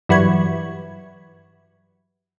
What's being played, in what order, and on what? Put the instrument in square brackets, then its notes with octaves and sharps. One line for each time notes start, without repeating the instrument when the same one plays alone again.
[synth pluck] G2 E3 F#3 B4 G#6